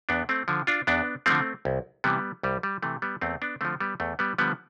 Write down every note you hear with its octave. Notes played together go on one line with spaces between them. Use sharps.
E2 B3 D4
A3 C4
D3 F3
D4 F4
E2 B3 D4
D3 F3 A3 C4
C2
C3 E3 G3 B3
C2 G3
G3
C3 E3 A3
G3 B3
E2 A3 C4
B3 D4
D3 F3 A3 C4
G3 B3
E2 A3
G3 B3
D3 F3 G3 B3